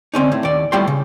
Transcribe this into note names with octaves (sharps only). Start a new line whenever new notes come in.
D3 C4 C#4 D#4
A2
D#2 D5
A2 G3 F4 G5 C6
C#3